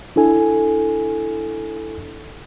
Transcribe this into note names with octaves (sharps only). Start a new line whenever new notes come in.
D4 E4 A4 G#5